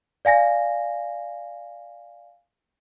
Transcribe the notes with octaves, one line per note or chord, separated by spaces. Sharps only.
D5 F5 G#5 A#6